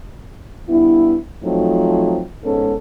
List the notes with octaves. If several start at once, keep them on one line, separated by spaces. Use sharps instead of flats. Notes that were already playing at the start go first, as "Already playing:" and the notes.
G2 B3 E4
F3 F#3 A3 C4 D#4
G#2 G#3 B3 C#4 A4